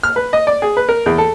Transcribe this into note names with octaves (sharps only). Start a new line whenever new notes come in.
F6
B4
D#5
D5
G#4
B4
A#4
E2
A4